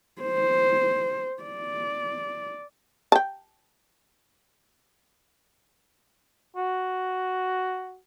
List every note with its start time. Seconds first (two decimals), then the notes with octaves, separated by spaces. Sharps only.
0.22 C5
1.43 D5
3.12 G5 A5
6.56 F#4